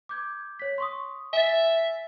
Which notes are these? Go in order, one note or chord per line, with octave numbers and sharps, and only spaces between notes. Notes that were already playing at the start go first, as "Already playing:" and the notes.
D6 G6 G#6
C#5 B6
C6 C#6 D#6
E5 G#5 A6